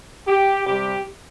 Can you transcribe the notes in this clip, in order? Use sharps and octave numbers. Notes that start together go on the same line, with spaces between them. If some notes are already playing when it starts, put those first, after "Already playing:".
G4
C3 G3 G4